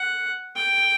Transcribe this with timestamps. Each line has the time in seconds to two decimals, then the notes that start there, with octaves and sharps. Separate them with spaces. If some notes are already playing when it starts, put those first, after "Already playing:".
Already playing: F#5
0.56 G5